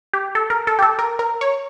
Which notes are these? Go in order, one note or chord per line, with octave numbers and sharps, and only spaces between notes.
G4
A4
A#4
A4
G4
A4
A#4
A#4
C#5